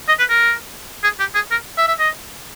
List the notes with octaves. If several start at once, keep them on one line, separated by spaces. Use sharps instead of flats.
D#5
B4
A#4
G#4
G4
G#4
A#4
E5
E5
D#5